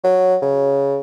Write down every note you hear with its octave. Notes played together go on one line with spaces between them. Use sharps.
F#3
C#3